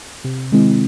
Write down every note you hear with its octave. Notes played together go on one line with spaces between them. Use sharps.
C3
D#3 G#3 C4 E4